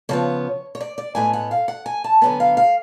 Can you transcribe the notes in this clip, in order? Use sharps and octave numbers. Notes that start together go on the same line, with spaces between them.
C#3 F3 B3 C#5
C#5
D5
D5
A2 G#3 B3 G#5
F#5
F5
F#5
G#5
A5
D3 F#3 B3 G#5
F5
F5